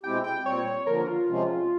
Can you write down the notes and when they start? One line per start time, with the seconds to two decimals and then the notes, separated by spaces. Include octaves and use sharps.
0.03 B2 G#3 C4 E4 G4 G5
0.24 G5
0.45 A#2 G3 C4 C#5
0.87 D3 F3 A#3 A#4
1.07 F4
1.28 C3 F3 G#3 C#4